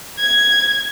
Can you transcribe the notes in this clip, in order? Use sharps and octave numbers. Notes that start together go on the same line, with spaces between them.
G#6